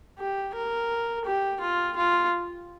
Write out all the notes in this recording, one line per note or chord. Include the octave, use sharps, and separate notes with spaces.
G4
A#4
G4
F4
F4